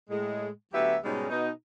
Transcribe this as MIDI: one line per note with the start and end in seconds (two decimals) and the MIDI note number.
0.10 0.49 45
0.10 0.49 56
0.73 0.96 38
0.73 0.96 54
0.73 0.96 59
0.73 0.96 67
0.73 0.96 76
1.04 1.27 44
1.04 1.27 47
1.04 1.27 55
1.04 1.27 56
1.04 1.27 61
1.04 1.27 63
1.30 1.49 47
1.30 1.49 63